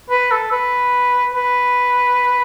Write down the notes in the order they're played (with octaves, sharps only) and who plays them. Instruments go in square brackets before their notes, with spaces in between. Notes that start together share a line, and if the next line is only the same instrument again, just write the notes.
[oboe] B4
A4
B4
B4